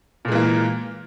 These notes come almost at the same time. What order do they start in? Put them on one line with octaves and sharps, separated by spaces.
A#2 G#3 E3 A#3